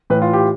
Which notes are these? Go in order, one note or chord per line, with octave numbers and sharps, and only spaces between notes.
A2 E3 B4
F4
G4